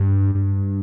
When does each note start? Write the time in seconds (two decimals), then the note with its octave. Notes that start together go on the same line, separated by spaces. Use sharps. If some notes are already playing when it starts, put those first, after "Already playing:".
Already playing: G2
0.35 G2